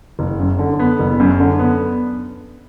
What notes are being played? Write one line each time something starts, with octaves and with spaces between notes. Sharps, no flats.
F#1
F#2
D3
B3
F#1
F#2
D3
B3